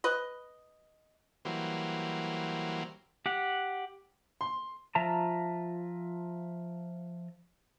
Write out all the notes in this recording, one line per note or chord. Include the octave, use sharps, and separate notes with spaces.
B4 D#5
E3 F#3 G3 A#3 C5
G4 F#5
C6
F3 F4 E5 A5 A#5